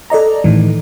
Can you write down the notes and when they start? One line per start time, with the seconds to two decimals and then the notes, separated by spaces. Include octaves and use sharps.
0.10 A4 D5 D#5 A#5
0.44 A2 D#3 E3